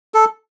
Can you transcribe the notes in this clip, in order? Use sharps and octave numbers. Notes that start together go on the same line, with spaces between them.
A4